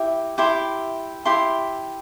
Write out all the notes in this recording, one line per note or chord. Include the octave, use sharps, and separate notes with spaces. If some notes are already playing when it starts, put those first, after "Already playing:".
Already playing: E4 G4 E5
E4 G4 E5 C6
E4 G4 E5 C6